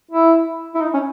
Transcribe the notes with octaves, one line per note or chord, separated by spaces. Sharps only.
E4
E4
D#4
C#4